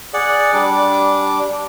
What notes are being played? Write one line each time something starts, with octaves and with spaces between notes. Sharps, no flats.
G#4 D5 F#5
G3 D4 D6